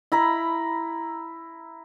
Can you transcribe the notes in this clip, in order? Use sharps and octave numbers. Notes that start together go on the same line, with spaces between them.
E4 A#5 B5